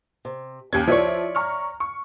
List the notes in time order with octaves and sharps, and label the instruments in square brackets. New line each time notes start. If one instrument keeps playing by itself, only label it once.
[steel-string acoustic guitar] C3
[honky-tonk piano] D#2 G#6 [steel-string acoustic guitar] C#4 G4
[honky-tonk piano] F3 E4 [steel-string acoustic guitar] C#5 D5 E5
[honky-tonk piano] A#5 C#6 F6
C#6